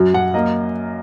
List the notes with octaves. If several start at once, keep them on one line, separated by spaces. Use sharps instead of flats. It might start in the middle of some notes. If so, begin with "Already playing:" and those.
Already playing: F#2 F#3
F#2 F#5
A#3 D#5